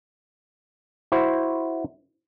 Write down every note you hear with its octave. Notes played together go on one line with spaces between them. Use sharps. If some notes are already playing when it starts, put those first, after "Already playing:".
E4 F#4 C5